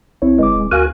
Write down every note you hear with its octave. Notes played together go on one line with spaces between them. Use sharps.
A#1 C4 E4 C#5
G1 G#3 B4 D6
D#1
D2 F#4 A#4 F5 G#5 F#6